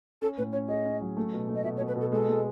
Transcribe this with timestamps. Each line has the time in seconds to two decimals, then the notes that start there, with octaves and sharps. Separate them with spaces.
0.22 C#4 A4
0.38 A2 B4
0.52 C#4 C#5
0.68 G#4 D#5
0.85 C#4
1.01 F#3
1.17 A3
1.33 B2
1.49 A3
1.55 D#5
1.64 B2 E5
1.77 C#5
1.80 B2
1.88 B4
1.96 B2
2.01 A4
2.12 G#3 A4
2.29 G#3